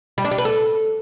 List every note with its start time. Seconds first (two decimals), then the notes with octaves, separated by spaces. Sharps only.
0.18 G3
0.25 D4
0.31 G3
0.38 B4
0.45 A4